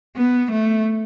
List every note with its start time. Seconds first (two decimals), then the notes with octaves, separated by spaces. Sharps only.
0.16 B3
0.51 A3